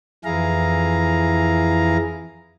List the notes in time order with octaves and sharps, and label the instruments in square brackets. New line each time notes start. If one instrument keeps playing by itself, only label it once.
[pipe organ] F2 E3 E4 G#4 F5 A#5